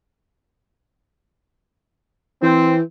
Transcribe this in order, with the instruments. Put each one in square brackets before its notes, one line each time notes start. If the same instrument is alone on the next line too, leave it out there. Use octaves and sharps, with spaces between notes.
[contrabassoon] E3 [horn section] C4